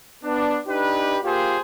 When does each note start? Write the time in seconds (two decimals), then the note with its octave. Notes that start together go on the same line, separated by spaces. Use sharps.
0.23 B3 D4
0.66 D4 D#4 G4 B4
1.24 A#3 F4 G4 G#4 C5